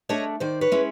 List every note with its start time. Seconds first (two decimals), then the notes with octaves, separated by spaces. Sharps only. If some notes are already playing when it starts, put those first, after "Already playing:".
0.09 A3 D4 C#5 D#5
0.40 D#3 C5 D5
0.61 B4 C#5
0.72 G#3 C#4 E4